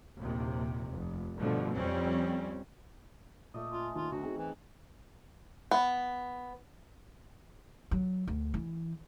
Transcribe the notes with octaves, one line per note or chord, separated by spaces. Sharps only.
A#1 D#2 C3
F1
G2 B2 D3 F3 A3
F2 G3 C4 C#4
A#2 A3 D5 D#5
C#4 F4
D#2 F4
D2 F#4
C4 D#4 G#4
E3
B3
F#3
D2
E3